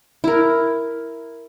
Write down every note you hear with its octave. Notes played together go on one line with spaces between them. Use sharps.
E4 A#4